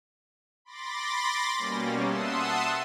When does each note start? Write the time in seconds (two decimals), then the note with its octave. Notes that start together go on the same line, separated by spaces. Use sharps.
0.65 B5 C6 D6 A6 A#6
1.58 B2 G3 A#3 C#4
2.04 E5 F#5 A5 C6 D#6 E6